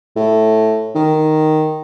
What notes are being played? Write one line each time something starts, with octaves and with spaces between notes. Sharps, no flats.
A2
D#3